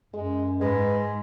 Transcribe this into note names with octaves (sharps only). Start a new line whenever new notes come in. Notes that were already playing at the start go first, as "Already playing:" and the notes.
F#2 G#3
G#2 G#3 B4